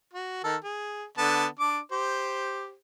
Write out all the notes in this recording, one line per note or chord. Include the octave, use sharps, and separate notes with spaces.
F#4
D#3 A4 A#4
G#4
D3 B3 A5
D4 D6
G4 C5